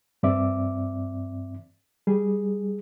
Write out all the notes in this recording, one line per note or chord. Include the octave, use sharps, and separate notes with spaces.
G2 C4 D5 E5 D6
G3 G#4